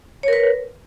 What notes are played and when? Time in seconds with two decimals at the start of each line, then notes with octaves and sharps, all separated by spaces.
0.23 C#5
0.28 A#4
0.33 B4